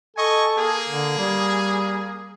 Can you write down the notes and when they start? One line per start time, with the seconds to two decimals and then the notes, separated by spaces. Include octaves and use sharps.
0.17 A4 D#5 G#5 C#6
0.57 A#3 G#4
0.89 D3
1.18 G3